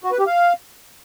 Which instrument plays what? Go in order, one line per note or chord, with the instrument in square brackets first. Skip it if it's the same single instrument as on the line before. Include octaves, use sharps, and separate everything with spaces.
[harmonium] F#4
B4
G4
F5